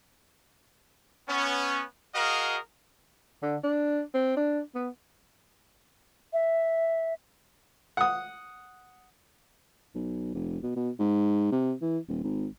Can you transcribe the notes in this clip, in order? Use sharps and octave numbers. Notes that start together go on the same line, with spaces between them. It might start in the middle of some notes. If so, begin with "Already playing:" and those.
B3 C#4
F#4 G#4 A#4 D#5 F5
D3
D4
C4
D4
B3
E5
F#5 D#6
B1
F1
B2
B2
G#2
C3
E3
D#1
G#1